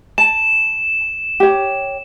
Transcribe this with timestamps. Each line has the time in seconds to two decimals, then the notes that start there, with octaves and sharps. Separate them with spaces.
0.18 A5 E7
1.40 G4 C#5